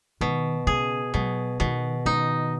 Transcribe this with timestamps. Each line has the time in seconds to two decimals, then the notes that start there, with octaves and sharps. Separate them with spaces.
0.21 B2 D#3
0.67 C#3 G#4
1.14 B2 F#3
1.60 B2 D#3
2.06 D#3 D#4